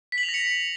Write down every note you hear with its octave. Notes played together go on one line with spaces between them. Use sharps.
B6
F#7
F7
A#6
C#7